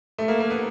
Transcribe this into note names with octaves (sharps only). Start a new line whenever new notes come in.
A3
A#3
A#3
B3